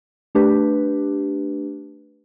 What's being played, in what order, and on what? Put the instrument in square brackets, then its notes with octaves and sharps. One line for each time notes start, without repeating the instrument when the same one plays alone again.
[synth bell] A3 D4 G4 B4